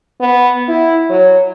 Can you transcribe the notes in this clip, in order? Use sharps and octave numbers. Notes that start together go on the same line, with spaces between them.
B3
E4
F#3